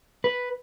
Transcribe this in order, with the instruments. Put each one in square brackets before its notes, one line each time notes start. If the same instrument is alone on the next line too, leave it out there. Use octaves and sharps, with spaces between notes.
[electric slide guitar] B4